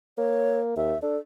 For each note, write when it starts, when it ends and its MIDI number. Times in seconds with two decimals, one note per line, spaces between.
0.18 0.71 58
0.18 0.60 73
0.77 0.94 39
0.77 1.00 76
1.02 1.17 62
1.02 1.19 69